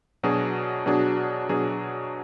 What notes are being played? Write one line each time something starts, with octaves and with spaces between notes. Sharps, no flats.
B2 F#3 D4 G#4
B2 F#3 D4 G#4
B2 F#3 D4 G#4